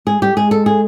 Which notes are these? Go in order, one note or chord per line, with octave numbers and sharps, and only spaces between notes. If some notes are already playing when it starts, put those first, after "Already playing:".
G#3 G#4
G3 G4
G#3 G#4
A4
G#4